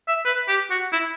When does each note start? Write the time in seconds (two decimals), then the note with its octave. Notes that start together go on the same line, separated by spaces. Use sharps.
0.08 E5
0.25 B4
0.48 G4
0.70 F#4
0.93 E4